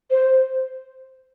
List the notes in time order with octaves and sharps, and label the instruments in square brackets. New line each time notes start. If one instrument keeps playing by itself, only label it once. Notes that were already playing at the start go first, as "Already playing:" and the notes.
[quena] C5